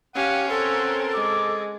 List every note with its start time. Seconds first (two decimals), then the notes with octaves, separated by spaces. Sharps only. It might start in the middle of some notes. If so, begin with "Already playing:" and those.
0.15 C#4 G4 F5 F#5 D#7
0.49 C4 A4 A#4 F#5
1.15 G#3 D6